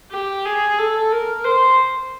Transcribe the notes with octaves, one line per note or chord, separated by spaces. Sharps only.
G4
G#4
A4
A#4
C5